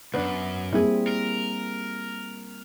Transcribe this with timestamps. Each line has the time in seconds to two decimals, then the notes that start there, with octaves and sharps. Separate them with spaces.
0.14 C#2 F#2 B3 D4
0.73 G3 A#3 C4 E4 G#4
1.07 A#4